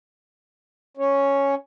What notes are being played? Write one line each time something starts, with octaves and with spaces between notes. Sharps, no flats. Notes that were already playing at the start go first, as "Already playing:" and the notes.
C#4